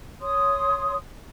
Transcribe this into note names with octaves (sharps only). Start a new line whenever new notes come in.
C#5 C6 D#6